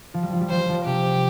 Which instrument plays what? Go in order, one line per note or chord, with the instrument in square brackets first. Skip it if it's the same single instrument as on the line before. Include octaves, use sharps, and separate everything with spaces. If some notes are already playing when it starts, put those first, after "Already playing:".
[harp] F3
G3
F3
G3
[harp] F3 [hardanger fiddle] C5
[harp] G3
F3
[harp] C3 [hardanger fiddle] G4